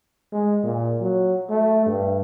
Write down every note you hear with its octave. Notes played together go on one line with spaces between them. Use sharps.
G#3
A#2
F#3
A3
G2